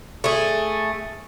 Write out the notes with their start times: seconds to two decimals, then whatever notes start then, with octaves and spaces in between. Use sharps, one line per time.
0.24 A3 G#4